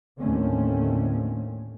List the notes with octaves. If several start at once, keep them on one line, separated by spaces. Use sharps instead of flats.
D#2 A2 D3 A3 C4 C#4